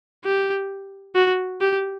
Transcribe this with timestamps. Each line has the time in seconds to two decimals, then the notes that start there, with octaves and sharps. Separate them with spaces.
0.25 G4
1.15 F#4
1.61 G4